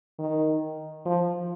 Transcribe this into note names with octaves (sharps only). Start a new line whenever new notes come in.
D#3
F3